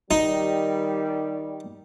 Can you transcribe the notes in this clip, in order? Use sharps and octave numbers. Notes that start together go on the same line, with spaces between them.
D#3 G3 D#4